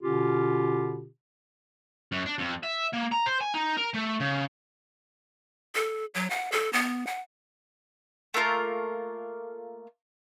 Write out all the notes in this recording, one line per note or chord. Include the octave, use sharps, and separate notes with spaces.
B2 D3 C#4 F4 G4
F#2
D4
F2
E5
A#3
A#5
C5
G#5
D#4
A#4
A3
C#3
A4
F#3
F#5
A4
B3
F#5
A3 A#3 F4 A#4